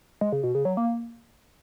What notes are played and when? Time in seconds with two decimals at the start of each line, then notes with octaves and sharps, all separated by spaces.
0.21 G#3
0.32 C#3
0.43 B2
0.55 C#3
0.65 F#3
0.77 A#3